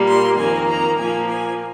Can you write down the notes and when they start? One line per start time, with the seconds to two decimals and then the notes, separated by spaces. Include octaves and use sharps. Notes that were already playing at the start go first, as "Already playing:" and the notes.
Already playing: A#2 G3 A#3
0.08 C6
0.38 F2 D#3 A#3 G#5
0.68 A#5
0.98 A#2 F3 A#3 G#5
1.29 G#5